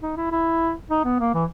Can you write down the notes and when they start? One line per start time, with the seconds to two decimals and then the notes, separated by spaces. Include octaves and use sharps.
0.03 D#4
0.17 E4
0.32 E4
0.91 D#4
1.05 B3
1.20 A#3
1.34 E3